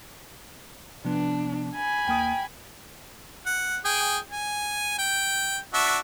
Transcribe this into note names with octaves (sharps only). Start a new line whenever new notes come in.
C3 F3 B3 D4
G#5 B5
D#2 A#3 G5 D#6
F#5
G#4 G5
G#5
G5
D4 F#4 E5